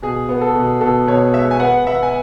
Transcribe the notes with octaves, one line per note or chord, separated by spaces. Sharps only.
B2 G#4
B3
A4
B2
B2 A4
B2 C#5
G#3 E5
G#5
B3 F#5
B3 E5
G#5